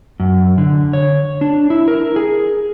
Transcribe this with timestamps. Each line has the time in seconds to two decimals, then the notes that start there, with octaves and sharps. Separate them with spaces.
0.20 F#2
0.58 D3
0.93 C#5
1.41 D4
1.70 E4
1.88 A#4
2.16 G#4